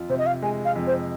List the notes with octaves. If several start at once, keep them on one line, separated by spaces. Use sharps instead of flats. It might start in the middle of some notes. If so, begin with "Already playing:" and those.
Already playing: F2 F4
C3 C5
D#5
F5
G#3 G#5
F5
F2
C5